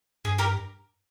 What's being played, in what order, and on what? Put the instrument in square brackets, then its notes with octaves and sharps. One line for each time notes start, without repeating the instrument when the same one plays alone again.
[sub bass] G2 [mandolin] G#4
[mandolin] G4 A#4